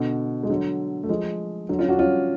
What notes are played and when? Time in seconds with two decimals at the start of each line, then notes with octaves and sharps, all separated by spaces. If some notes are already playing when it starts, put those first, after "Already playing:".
Already playing: B2 D3
0.43 G#3
0.50 D3 F#3
1.03 A3
1.09 F3 G#3
1.69 D3 F#3
1.79 C#4 F4
1.89 D4 F#4
1.99 C#4 F4